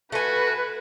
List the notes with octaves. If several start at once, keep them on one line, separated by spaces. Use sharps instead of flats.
A3 F#4 B4 G#5